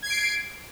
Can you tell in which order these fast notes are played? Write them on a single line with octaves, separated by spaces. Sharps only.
G#6 C7 D7